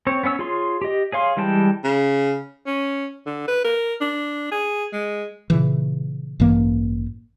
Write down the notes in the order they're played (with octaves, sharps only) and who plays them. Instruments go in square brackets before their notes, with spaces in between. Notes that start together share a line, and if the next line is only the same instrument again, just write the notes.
[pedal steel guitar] C4 C#5
B3 C#4 C#5 E6
F4 G#4 C#5 C6
G4 D#5
G#4 C#5 F5 C6
E3 G3 G#3 G5 A5
[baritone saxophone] C#3
[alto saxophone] C#4
D3
B4
A#4
D4
G#4
G#3
[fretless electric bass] A#2 C#3 E3
A1 G2 E3 A#3